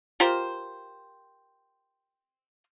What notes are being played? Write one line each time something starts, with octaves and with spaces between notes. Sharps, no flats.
F4 G4 A#4 C5